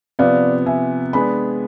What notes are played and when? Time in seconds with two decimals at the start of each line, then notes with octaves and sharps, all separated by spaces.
0.19 C3 F3 B3 D5 F5
0.66 E5 G#5
1.13 G#3 B3 D4 G#5 B5